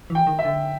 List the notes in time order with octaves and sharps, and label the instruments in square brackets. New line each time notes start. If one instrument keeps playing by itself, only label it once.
[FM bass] E3
[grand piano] G5
[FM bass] D#3
[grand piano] E5
[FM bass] D3